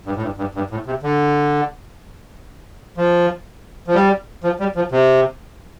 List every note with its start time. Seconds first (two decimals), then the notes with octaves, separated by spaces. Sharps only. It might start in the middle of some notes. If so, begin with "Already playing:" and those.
0.06 G2
0.16 A2
0.22 G2
0.37 G2
0.55 G2
0.71 A2
0.86 C3
1.03 D3
2.97 F3
3.87 F3
3.94 G3
4.44 F3
4.59 G3
4.76 F3
4.92 C3